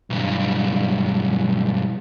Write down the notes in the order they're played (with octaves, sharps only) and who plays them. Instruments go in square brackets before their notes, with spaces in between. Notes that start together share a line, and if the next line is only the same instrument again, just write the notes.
[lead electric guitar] B1 G2